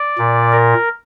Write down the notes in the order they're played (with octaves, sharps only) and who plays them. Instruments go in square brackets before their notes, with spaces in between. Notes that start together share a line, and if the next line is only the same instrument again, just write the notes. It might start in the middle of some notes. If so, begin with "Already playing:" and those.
Already playing: [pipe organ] D5
A#2
A#4